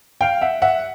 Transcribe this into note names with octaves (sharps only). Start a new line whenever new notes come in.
F5 G5
E5 F#5
E5 F#5